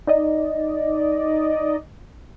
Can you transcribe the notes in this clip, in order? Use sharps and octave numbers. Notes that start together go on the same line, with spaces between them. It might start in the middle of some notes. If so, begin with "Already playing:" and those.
D#4 D5 D#5